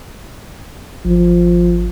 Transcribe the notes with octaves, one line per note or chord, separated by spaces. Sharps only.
G#1 F3